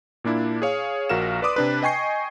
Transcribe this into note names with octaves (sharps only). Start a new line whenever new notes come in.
A#2 A#3 D4 E4
G#4 C#5 F5
A#1 F#4 A#4 F5 E7
B4 D5 C6 D6 D#6
C3 D4 B4
D#5 G5 G#5 C#6 C7